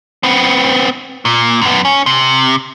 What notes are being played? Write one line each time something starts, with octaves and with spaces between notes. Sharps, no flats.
B3 C4
A#2
F#2 B3
C#4
C3